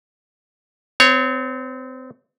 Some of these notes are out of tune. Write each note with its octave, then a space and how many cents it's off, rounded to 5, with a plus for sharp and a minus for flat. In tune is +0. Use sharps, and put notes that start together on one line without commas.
C4 -30 C#5 +0